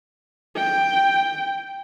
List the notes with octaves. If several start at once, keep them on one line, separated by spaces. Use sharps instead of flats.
G5